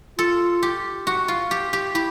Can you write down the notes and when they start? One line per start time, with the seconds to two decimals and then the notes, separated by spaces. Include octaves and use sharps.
0.18 F4 A4
0.63 G4
1.07 F#4
1.28 F4
1.51 G4
1.73 G4
1.95 E4 G4